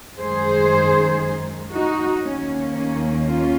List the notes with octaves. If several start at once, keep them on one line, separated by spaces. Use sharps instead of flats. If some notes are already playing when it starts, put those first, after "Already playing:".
F#2 D#3 G#3 G#4 C5
D#4 F#4
D#2 D#3 A#3 C#4
C#4
C#4 F4